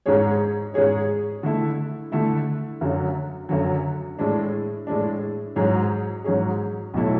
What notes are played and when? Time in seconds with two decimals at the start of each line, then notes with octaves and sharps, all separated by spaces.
0.06 G#2 G#3 C#4 G#4 C#5
0.74 G#2 G#3 C#4 G#4 C#5
1.43 D3 A3 E4
2.12 D3 A3 E4
2.81 F#2 D3 F#3
3.49 F#2 D3 F#3
4.18 A2 G#3 D4
4.87 A2 G#3 D4
5.56 G#2 F#3 C#4 G#4
6.24 G#2 F#3 C#4 G#4
6.94 B1 A2 F#3 A3 E4